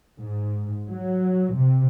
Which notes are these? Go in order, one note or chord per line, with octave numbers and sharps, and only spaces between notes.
G#2
F#3
C3